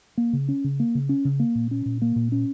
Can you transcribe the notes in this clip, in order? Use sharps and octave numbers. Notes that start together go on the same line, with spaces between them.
A#3
C#3
C#4
C#3
A#3
C#3
C#4
C#3
A#3
A#2
C#4
A#2
A#3
A#2
C#4